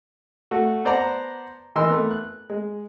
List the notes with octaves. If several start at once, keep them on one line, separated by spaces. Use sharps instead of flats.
A3 F#4
B3 C5 D5 F#5 A5 A#5
E3 D#4 A#4 C6 E6
A3 B3
F#6
G#3